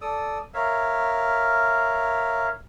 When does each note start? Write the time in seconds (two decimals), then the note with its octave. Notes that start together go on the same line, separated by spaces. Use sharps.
0.01 A4 D5 D#6 E6
0.54 A#4 C#5 E5 F5